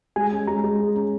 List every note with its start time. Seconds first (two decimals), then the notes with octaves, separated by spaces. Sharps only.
0.16 G#3 G#5
0.32 C#4
0.47 G#3 A#5
0.64 G#3
0.79 G#4
0.95 C#4